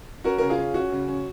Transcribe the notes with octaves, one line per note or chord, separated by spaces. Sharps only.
C#4 F#4 A#4
C#3 A#4
F4 G#4
C#4
C#4 F#4
C#3
C#4